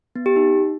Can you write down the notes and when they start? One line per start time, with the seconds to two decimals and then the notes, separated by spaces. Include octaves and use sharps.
0.15 B3
0.26 G4
0.36 D#4